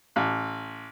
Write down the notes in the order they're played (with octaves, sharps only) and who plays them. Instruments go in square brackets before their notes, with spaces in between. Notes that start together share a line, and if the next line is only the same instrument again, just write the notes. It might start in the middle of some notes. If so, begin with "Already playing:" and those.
[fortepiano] A1